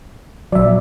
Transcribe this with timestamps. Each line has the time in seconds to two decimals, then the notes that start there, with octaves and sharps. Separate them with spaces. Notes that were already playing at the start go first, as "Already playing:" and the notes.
0.52 A#1 F#3 D5 E5